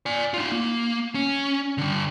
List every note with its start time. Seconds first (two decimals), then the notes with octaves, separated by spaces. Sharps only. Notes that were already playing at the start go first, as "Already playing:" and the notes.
0.06 D5 G#5
0.34 D#4 F4
0.52 A#3
1.15 C#4
1.78 D3 G3